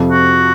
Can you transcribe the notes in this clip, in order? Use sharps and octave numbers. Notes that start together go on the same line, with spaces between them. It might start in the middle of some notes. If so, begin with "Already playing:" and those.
Already playing: F2 C3 F3
F#4